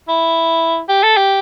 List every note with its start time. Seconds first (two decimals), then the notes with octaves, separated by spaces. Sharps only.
0.09 E4
0.89 G4
1.03 A4
1.17 G4